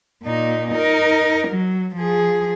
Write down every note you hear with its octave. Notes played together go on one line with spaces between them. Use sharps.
A#2 D#4
D#4 A#4
F#3
F3 G#4